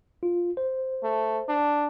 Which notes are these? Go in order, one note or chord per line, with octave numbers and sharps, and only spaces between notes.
F4
C5
A3
D4